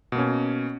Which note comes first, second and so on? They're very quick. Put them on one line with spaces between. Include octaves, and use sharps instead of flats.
B2 A#3 C#4